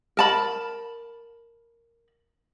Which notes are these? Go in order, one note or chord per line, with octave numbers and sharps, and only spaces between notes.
A#4 A5 B5